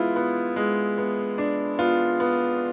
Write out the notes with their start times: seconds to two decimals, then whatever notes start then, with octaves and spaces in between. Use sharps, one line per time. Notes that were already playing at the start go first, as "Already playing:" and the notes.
Already playing: G#3 B3 E4 F4
0.16 B3
0.56 G#3
0.98 B3
1.38 D4
1.79 B3 F4
2.20 B3